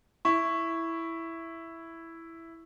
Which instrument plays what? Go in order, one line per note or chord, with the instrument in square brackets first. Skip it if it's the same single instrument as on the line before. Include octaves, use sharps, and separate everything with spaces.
[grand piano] E4 [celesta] C#6